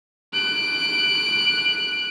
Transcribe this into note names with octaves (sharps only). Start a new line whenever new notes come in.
F#6 D7